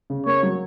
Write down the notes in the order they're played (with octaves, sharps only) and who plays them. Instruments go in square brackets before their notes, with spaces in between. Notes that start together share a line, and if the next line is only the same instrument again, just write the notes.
[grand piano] C#3
[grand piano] A#3 [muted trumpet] C#5
[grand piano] F#3